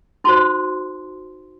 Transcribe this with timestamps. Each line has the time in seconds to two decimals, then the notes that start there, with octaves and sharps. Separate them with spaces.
0.24 D#4 F#4 C5 A5 C6